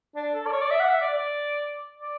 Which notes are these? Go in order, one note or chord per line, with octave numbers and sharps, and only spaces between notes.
D4
A4
D5
C#5
D5
E5
F#5
E5
D5
D5
D5